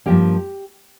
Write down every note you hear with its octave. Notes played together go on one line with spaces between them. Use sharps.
G2 F3 A#3 G4